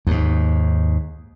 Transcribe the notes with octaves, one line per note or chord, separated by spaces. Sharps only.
D#2 G#2